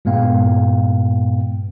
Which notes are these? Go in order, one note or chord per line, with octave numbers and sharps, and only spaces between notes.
G2 A#2 G#3 B3 F5 G5